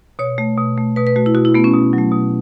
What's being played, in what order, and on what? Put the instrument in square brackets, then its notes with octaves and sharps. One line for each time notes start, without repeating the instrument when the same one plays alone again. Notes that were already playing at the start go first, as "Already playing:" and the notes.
[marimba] B2 C#5
A3
B2
A3
B2 B4
B4
A3 F#4
E4
B2 F#4
E4
A3 B3
C#4
B2
F#3
A3
B2